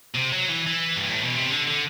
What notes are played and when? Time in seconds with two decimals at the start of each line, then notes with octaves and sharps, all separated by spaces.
0.15 C3
0.32 F#3
0.49 E3
0.67 E3
0.96 G2
1.09 A2
1.23 B2
1.36 C3
1.50 D3
1.67 D3